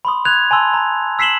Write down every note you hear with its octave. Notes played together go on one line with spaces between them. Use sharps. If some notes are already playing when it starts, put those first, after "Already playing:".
B5 C6 D#6
F#6 G#6 F7
G#5 A5 C6 E6
A#5
E6 B6 C7 E7 F#7 G7